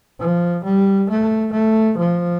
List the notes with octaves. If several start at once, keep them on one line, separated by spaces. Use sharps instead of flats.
F3
G3
A3
A3
F3